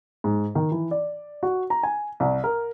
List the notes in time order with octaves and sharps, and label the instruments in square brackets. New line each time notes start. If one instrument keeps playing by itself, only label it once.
[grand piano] G#2
D#3
E3
D5
F#4
A#5
G#5
C2
A#4